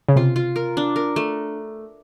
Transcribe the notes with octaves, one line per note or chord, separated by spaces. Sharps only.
C#3
C3 F4
F4
A#4
D4
A#4
A3